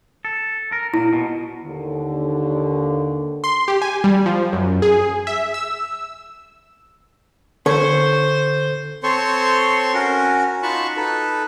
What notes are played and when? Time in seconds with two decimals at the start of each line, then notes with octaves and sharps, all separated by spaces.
0.25 A4
0.72 A#4
0.94 A#2 E4
1.13 B2
1.64 D#2 D3
3.44 C6
3.68 G4
3.82 G#5
4.04 G3
4.26 F3
4.53 F#2
4.82 G#4
5.27 E5
5.54 E6
7.66 D3 A4 C5 C#5
9.03 C4 A4 C5 C#5 C6 C#6
9.94 C#4 F#4 A#4
10.63 D#4 F4 F#4 A5 B5 C#6
10.96 D#4 A4 B4